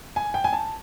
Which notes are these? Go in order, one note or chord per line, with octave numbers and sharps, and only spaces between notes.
G#5
G5
G#5
A5